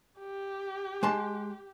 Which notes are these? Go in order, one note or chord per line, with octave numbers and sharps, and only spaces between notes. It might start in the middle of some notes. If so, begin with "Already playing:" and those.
G4
G#3 A5 C6